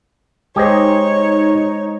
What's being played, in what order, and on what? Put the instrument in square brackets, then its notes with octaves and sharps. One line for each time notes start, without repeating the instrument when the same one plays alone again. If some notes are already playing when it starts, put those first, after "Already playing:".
[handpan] G#3 C5 [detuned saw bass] D#4 [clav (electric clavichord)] G4 G#4 D#5 [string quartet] C#5